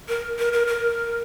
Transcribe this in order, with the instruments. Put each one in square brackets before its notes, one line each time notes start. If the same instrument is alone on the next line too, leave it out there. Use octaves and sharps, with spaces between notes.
[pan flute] A#4
A#4
A#4
A#4